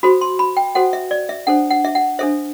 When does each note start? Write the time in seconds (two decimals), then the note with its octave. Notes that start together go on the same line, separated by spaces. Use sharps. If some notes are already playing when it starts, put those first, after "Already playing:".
0.03 F#4 A4 C5 B5
0.21 C6
0.39 B5
0.57 G5
0.75 F#4 A4 C5 F#5
0.93 E5
1.11 D5
1.29 E5
1.47 D4 A4 C5 F#5
1.71 F#5
1.85 E5
1.95 F#5
2.19 D4 A4 C5 E5